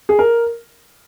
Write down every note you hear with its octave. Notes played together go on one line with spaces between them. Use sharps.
G#4
A#4